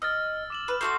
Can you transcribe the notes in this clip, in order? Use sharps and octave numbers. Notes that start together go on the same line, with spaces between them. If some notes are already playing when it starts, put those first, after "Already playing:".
D#5 E6 F6 A6
D6 E7 F#7
B4
A3 F#4 C6 D6 G6 C7